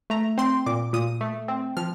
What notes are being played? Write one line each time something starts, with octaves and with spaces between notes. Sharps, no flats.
A3 A#5
C4 C6
A#2 D6
A#2 D#6
A3
C4
F3 F6